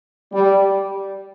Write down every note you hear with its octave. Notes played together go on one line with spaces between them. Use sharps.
G3